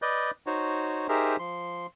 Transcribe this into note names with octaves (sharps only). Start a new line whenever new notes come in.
B4 D5 D#5 G6
D#4 F#4 C5 C#5
D#4 G4 G#4 A#4 C5 E5
F3 C6